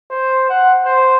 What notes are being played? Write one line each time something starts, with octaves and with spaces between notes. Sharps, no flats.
C5
F#5
C5